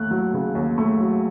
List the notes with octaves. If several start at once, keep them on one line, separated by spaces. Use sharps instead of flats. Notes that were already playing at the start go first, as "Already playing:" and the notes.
Already playing: D#2 A3 F#6
F#3
C#3
D#2
A3
F#3